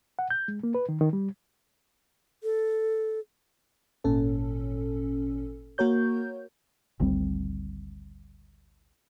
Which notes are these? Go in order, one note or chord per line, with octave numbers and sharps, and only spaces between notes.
F#5
G6
G#3
A#3
B4
D#3
D#3
G3
A4
G#1 A#2 C#4 A4
A#3 F#4 A#4 C#5 G6
G#1 D2 G3 C4